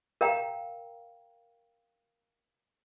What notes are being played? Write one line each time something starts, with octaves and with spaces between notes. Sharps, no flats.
A#4 F5 G5 A#5